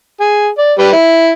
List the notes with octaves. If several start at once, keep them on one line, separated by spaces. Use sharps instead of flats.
G#4
D5
G3 G4 B4
E4